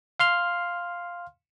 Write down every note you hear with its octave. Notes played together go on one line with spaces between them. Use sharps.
F5 C6 F6